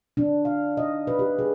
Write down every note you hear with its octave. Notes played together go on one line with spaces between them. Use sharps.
D4
F5
D#5
B4
G4
G#4